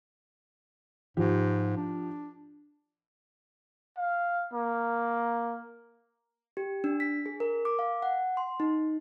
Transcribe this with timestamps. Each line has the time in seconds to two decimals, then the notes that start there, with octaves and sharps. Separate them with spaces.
1.17 G#2 F3 G4
1.77 D4
3.97 F5
4.53 A#3
6.57 G4
6.84 D4
7.00 B6
7.26 G#4
7.40 A#4
7.65 D6
7.79 F5
8.02 F#5
8.37 C6
8.60 D#4